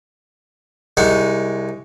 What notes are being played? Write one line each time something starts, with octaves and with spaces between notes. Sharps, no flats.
C2 G#3 D#4 F#5